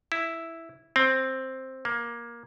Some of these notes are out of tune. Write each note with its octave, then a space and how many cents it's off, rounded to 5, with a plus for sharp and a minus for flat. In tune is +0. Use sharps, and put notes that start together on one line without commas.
E4 +0
C4 +5
A#3 +15